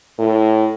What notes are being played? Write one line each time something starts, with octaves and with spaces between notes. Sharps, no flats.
A2